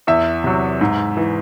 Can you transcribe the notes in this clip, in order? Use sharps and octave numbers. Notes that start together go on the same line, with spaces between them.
E2 E5
C3 F#3
G#2
E3